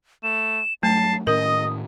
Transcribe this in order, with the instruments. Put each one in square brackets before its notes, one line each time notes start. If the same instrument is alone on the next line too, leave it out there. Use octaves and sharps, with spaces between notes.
[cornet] A3 [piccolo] E7
[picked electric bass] G2 F#3 [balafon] A3 [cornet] A5 [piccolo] C7
[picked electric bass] A2 D#3 C#4 [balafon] A#4 [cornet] D#5 [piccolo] D#6